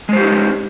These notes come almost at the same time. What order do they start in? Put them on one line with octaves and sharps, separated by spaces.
G#3 C5 G4 D#4 C#4